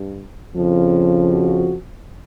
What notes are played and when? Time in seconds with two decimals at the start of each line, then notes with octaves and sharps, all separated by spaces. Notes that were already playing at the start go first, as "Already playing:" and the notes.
Already playing: G2
0.55 F2 C#3 F3
1.30 F#4